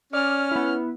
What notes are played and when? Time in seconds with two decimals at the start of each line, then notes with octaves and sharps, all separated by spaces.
0.13 C#4 D5 F6
0.51 B3 E4